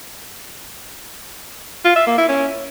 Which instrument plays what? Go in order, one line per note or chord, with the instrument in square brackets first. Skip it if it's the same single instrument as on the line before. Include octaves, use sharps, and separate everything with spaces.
[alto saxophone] F4
E5
A#3
E4
C#4